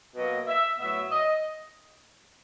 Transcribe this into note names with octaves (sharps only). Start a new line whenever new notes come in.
B2 F#3 A#3 D#5
E5
A2 F#3 B3 E5
D#5